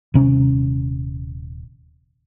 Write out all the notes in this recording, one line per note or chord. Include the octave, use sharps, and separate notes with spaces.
D#1 C3 C#4